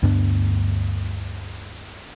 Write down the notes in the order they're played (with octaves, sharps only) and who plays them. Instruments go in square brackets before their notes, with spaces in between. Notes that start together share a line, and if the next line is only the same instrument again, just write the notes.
[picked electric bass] D2 G2 B3 D4